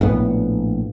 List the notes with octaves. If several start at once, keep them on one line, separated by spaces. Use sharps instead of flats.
A#1 A2 B3